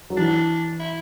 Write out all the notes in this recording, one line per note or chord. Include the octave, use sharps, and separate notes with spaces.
F#3
E3 D4
E4